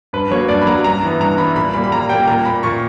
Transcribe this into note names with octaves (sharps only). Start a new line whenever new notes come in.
G2 B4
F#3 A#3 C#5
G2 D5
B5
F#3 A#3 A#5
G2 A#5
E3 B3
G2 A#5
E3 B3 B5
A#2 B5
G3 A#3 B5
B5
A#2 A#5
G3 A#3 G5
A#2 A#5
A#3 B5
A#2 C#6